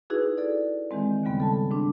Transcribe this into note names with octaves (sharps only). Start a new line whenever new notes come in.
D#4 E4 F#4 G#4 B4
G#4 A4 D5
D#3 E3 G#3 C4
D#2 G#2 C#3 G3 B3
A4 A5
G#2 D4